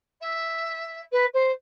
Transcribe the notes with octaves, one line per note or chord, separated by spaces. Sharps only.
E5
B4
C5